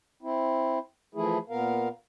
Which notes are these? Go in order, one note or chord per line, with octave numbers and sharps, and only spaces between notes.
C4 E4
E3 F3 A3 E4 G#4
A#2 B3 A#4 F5